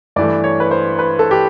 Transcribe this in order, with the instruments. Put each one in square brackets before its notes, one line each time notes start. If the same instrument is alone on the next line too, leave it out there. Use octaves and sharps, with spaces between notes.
[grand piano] G2 E3 A3 D5
C#5
B4
C5
B4
A4
G4